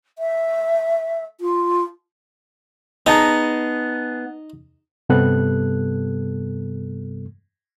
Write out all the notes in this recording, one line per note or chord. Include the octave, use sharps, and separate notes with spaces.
E5
F4
B3 D#4 G#4 A5 A#5
G2 C3 G3 B3 A4 F#6